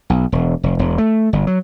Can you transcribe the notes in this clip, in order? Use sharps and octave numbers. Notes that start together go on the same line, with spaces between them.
B1
E1
F1
E1
A3
G1
F#3